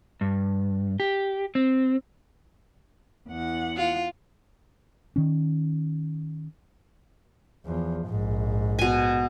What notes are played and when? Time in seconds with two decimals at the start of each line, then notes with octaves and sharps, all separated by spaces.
0.21 G2
1.00 G4
1.55 C4
3.29 E2 F#5
3.77 F4
5.16 D#3 C#4
7.66 E2 F3
8.07 A#1 G#2
8.79 B2 G#5